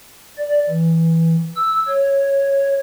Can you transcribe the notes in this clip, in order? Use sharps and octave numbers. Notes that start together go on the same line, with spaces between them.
D5
E3
E6
C#5